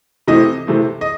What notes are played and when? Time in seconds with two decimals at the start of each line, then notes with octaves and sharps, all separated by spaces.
0.27 C3 E3 A3 C4 D#5
0.67 C3 E3 A3 C4
1.01 D#5